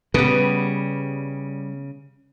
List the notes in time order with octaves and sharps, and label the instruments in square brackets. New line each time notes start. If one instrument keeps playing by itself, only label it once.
[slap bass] C#3 [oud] G3 B3